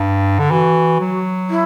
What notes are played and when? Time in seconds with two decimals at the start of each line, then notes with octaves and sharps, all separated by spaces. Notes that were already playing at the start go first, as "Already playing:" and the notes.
Already playing: G2
0.39 D3
0.50 E3 F#4
1.00 F#3
1.50 E4